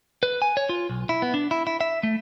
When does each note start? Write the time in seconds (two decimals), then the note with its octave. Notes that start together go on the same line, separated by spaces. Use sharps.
0.23 B4
0.42 G#5
0.57 C#5
0.69 F4
0.89 B1
1.09 E4
1.22 B3
1.34 D4
1.51 E4
1.67 E4
1.81 E5
2.03 A3